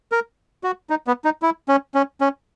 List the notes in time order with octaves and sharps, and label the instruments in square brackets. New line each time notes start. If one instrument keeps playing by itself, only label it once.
[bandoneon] A#4
F#4
D#4
B3
D#4
E4
C#4
C#4
C#4